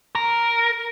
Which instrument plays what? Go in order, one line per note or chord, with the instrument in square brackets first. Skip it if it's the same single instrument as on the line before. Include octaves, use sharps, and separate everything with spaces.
[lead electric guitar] A#4